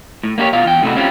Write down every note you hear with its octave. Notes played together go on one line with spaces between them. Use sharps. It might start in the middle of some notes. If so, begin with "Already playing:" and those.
A2
A#3 D4 F#4 G4 C#5
B2 F4 F5
E2 G5
A2 C3 A3 E4 F#4
C4 C#4 E4 F4 G4